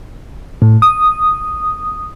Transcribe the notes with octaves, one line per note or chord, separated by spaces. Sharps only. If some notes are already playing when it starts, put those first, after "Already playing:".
A2
D#6